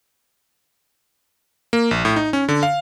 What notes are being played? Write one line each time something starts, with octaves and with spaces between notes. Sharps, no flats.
A#3
A#1
A2
D#4
C#4
D3
F5